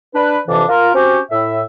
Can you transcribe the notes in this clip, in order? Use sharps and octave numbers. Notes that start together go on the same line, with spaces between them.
D4 B4
F2 C3 E3 D4
F4 A#4
C4 C#4 F#4 G4
A2 E5